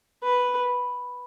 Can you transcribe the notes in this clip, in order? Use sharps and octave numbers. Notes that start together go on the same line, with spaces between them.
B4